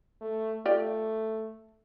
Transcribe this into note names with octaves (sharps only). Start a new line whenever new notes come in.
A3
A3 F4 G4 D5